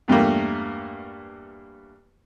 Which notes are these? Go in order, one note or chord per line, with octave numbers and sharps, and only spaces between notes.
E2 G2 A3 A#3